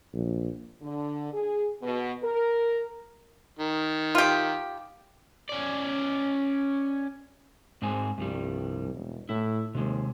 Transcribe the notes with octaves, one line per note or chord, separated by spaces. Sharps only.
A#1
D3
G#4
B2
A#4
D#3
F4 G4
C#4 D5
G#2 G#3 C4 G#5
C2 G2 F3 G3
E1
A2 E4
D#2 C3 G#3